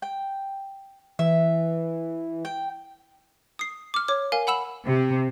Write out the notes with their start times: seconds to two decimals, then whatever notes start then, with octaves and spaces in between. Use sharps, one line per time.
0.02 G5
1.19 E3 E5
2.45 G5
3.59 D#6 C7
3.94 D6 F6
4.08 C#5 D6
4.32 A#4 F5 G#5
4.47 F#5 B5 E6 E7 F#7
4.86 C3